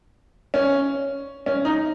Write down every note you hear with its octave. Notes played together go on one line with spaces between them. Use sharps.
C#4
C#4
D#4